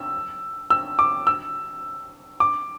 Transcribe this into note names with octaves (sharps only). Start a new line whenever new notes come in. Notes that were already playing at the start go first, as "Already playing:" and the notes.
Already playing: E6
E6
D6
E6
D6